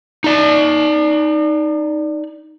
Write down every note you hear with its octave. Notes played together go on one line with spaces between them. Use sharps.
D#4 D5